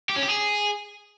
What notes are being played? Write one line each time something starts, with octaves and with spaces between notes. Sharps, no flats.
G4
C#4
G4
G#4